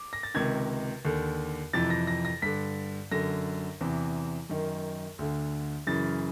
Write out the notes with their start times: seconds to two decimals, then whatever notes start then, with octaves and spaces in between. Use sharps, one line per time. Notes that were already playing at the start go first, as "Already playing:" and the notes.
Already playing: D6
0.13 A#6
0.23 A6
0.34 C#2 C3 D#3 G#6
1.05 D#2 D3
1.73 F2 C3 E3 A6
1.90 A#6
2.07 A#6
2.25 A#6
2.42 G2 D3 B6
3.11 F#2 D3 A#6
3.81 E2 C3 E3
4.49 F#2 D#3
5.19 D2 D3
5.87 F#2 C#3 E3 A6